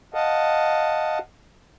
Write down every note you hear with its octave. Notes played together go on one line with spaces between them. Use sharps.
D#5 F5 F#5 A5